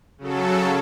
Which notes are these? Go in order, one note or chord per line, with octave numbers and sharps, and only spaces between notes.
C#3 F#3 A4